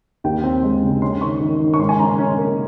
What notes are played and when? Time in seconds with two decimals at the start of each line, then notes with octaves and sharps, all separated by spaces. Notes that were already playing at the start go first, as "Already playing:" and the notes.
0.24 D#2 G5
0.43 C4
0.63 G#3
0.82 C#3
1.01 C#4 C6
1.21 D#3 C#6
1.41 D#3
1.60 D#3
1.74 C#6
1.79 G#2 C6
1.89 G#5
1.99 C#4 A#5
2.09 C6
2.18 C#4
2.38 A#3